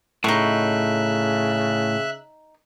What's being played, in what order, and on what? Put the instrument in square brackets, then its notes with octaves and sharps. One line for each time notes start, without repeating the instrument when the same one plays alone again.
[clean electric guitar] A2 [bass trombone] C#3 [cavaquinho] D#4 C#6 [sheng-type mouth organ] E5 F#6